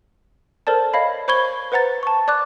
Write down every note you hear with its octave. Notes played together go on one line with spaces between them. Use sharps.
A4 A#4 C5 D5 A5
C#5 D#5 F5 B5
C5 B5 C#6 G#6 G7
B4 C5 F#5 A#5 A6
A5 C#6
D5 D6 F#6